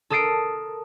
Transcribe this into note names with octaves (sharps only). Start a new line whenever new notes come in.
A4 A#4 D#6 A6 C7 D7